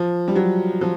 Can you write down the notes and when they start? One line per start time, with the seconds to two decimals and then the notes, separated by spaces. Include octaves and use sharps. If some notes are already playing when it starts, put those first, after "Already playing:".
Already playing: F3
0.28 G3
0.36 F#3
0.81 F3